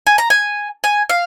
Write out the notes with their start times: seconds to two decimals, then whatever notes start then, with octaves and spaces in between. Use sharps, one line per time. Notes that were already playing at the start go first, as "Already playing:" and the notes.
0.07 G#5
0.18 A#5
0.30 G#5
0.84 G#5
1.10 F5